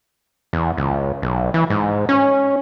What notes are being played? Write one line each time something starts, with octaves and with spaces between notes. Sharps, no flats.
E2
C#2
B1
E3
G#2
C#4